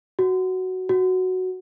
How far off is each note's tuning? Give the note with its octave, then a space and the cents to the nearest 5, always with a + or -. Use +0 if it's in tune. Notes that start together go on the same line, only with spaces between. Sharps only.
F#4 +5
F#4 +0